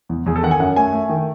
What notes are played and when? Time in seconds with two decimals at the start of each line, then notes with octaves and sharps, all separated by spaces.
0.09 E2
0.26 E2 G#4
0.36 A4
0.43 D#3 F#5
0.51 G#5
0.60 F#2 F#5
0.76 A3 G#5
0.93 A3
1.09 D#3